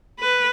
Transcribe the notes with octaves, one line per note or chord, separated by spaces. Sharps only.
B4